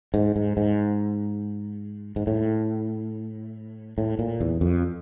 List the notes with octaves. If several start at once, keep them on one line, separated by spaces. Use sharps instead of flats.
G#2
G#2
G#2
G#2
A2
A2
A#2
E2
F2